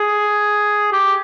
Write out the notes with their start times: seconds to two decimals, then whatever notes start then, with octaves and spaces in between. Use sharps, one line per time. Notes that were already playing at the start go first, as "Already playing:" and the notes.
Already playing: G#4
0.93 G4